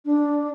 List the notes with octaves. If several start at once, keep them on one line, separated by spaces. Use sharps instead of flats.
D4